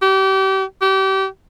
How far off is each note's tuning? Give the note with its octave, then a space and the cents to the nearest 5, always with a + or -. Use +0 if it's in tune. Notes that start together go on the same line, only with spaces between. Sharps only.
G4 -35
G4 -30